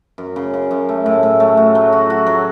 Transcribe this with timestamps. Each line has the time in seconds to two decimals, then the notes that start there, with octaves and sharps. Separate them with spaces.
0.18 F#2
0.36 C#3
0.54 C#3
0.71 F#2
0.89 A3
1.06 A2
1.23 A2
1.40 A3
1.57 F#4
1.75 F#3
1.93 F#4
2.10 F#4
2.27 F#3